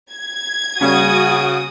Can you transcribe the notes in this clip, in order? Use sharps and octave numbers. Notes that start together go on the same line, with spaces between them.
G#6
C#3 G3 A#3 C#4 F#4 D#6